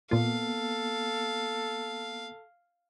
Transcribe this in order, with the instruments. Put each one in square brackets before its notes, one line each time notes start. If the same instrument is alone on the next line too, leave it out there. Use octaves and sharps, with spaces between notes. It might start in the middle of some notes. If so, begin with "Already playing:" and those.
[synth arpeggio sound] A#2 F4 [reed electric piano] A#3 B3 [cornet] A4 [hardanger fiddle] F5